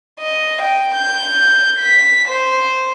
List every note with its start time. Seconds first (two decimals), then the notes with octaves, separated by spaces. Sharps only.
0.20 D#5
0.62 G5
0.95 G6
1.79 B6
2.29 C5